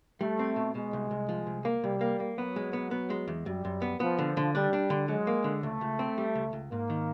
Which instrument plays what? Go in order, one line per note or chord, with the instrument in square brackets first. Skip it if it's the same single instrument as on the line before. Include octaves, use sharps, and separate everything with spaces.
[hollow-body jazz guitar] G3 [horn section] A3
[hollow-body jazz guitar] C4
B2
[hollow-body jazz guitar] B2 [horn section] G#3
[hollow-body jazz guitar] C2
C2
F3
C2
A#3
[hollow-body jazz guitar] C2 [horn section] G3
[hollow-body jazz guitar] A#3
A#3
[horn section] F#3 [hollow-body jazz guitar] B3
[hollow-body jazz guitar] G#3
B3
B3
G#3
E2
[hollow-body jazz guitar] F#2 [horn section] G3
[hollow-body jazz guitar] F#2
B3
[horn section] F3 [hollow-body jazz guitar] B3
[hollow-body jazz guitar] D3
D3
[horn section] G3 [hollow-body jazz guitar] D4
[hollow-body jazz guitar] D4
D3
[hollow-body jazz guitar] F#3 [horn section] G#3
[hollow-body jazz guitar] A#3
D3
[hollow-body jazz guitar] C#2 [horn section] A3
[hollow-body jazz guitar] C#2
C4
G3
C#2
C#2
[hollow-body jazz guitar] G#2 [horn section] A#3
[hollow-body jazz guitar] D#3